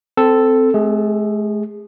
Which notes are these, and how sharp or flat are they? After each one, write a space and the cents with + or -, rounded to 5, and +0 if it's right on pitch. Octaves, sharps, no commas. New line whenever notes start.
C4 -15 A4 +0
G#3 +45 G#4 -25